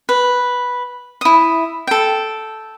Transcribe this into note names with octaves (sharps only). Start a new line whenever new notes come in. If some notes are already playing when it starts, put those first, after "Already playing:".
B4
E4 D#6
A4 G5